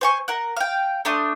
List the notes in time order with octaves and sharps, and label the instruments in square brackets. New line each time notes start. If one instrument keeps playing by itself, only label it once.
[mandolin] C5 G#5 C#6
A#4 F#5
F5 G5
A3 D4 C6 D#6